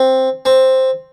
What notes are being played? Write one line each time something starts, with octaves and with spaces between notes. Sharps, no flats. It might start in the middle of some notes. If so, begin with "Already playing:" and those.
Already playing: C4
C4